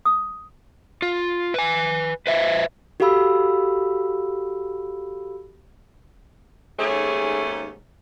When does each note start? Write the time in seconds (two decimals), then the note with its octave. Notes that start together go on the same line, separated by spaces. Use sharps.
0.05 D#6
1.02 F4
1.54 B4 G#5
2.27 B4 C5 E5
3.00 F#4 G4 A4 F5 B5 E6
6.79 D#2 G#2 A3 C#4 G#4 C#5